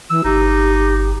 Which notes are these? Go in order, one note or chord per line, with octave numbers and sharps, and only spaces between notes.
E3 E6
G1 D#4 G4